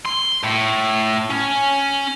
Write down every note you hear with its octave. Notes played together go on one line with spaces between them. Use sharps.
C6
A2
C#4